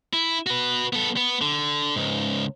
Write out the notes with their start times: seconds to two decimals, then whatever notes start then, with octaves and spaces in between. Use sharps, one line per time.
0.13 E4
0.47 F#4 B4
0.93 B3 A4
1.17 B3
1.42 D3
1.96 C#2 G#2